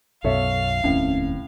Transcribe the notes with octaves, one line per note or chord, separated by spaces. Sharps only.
B1 F#2 B2 A4 C#5 E5 F5
F1 D#2 A2 C4 C#4